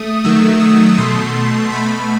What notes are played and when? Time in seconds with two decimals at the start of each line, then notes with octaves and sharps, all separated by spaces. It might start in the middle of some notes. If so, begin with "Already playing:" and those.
Already playing: A3 D#6
0.24 D#3 F#3 A3 E6
0.60 D#6
0.98 B2 A3 C6
1.72 B2 A3 B5